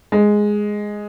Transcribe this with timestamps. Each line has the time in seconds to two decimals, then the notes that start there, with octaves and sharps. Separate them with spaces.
0.12 G#3